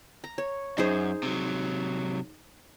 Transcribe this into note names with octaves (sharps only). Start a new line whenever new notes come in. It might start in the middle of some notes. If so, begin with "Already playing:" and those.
A#5
C#5
F#2 D#4 G#4 C5
C3 F#3